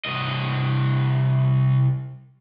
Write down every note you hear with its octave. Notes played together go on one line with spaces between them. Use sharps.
C2 D#5